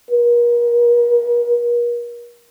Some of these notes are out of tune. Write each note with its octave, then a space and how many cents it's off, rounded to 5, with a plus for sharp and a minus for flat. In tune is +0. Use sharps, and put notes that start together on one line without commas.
A#4 +40